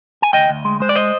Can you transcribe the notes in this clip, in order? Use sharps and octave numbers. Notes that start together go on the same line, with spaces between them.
G#5
D2 D#5 G5
D2
G#3
G#3 C5
D5
C5 D#5